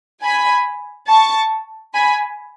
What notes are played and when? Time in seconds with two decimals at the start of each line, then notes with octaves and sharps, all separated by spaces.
0.23 G#5 B5
1.08 A5 C#6
1.94 G#5 B5